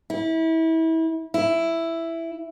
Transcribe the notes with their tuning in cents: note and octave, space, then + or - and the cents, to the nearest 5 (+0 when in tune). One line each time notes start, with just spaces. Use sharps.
E4 -30
E4 +5